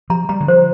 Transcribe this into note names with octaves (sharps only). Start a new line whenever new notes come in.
F3 A#5
G3 A#5
D3
F3 C5